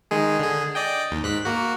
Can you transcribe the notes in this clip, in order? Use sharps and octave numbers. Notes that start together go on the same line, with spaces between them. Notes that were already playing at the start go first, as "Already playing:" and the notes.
D#3 G#3 G#4
D3 G#4
D5 D#5 G5
D#2
G#2 F#6 B6
A#3 F#4